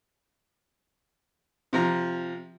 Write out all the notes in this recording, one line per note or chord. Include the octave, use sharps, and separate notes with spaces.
C3 F3 A#5